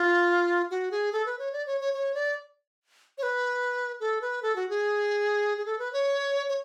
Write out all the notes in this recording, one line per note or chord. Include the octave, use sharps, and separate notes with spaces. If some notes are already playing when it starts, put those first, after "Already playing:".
Already playing: F4
F#4
G#4
A4
B4
C#5
D5
C#5
C#5
C#5
D5
C#5
B4
A4
B4
A4
F#4
G#4
G#4
A4
B4
C#5
C#5